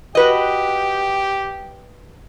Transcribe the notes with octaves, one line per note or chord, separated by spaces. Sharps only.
F#4 G4 B4 D#5